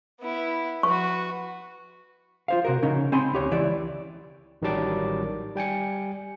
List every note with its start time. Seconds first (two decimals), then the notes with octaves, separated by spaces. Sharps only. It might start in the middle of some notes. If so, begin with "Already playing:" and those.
0.20 B3 E4
0.83 F#4 B4 C#6
2.48 F4 C5 F5
2.65 C3 F#4 A#4
2.83 C#3 C#4 D#4
3.12 C4 G#5 B5 C6
3.33 D2 G4 C#5
3.51 C#2 E3 E4 D5
4.62 A1 D#3 F#3 G3 A5 D6
5.55 G3 G5 G#5 C#7